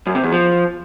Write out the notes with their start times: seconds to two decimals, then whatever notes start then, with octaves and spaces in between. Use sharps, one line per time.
0.07 F#2
0.15 C3
0.23 E2
0.32 F3